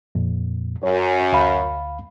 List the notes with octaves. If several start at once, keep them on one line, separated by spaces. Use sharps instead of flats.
F2 A#2
F#2 C#5
D2 F5 B5